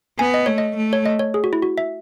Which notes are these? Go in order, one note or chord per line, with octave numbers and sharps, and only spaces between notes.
B3 G#5
D#5
A3 C#5
D#5
A3
C#5
D#5
C#5
G#4
F#4
E4
F#4
E5